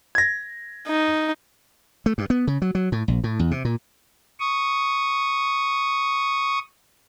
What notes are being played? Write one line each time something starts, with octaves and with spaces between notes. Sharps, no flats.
G#6 A#6
D#4
A3
G2
B3
C#3
F#3
F#3
A2
A#1
A2
E2
C3
A#2
C#6 D#6